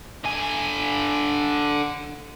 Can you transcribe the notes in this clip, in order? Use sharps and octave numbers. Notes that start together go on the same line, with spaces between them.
D3 G#5